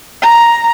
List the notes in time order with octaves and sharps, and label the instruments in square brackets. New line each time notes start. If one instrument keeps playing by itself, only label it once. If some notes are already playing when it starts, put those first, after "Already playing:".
[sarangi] A#5